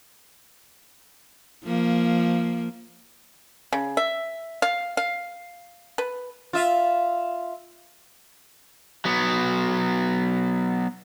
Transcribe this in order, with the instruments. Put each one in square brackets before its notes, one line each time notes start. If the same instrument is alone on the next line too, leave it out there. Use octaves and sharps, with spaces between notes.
[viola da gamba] F3 A#3
[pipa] C#3
E5
F5
F5
B4
[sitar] F4 E5
[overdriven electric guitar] F#3 B3